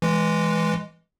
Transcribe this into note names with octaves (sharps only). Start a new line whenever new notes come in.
E3 G#3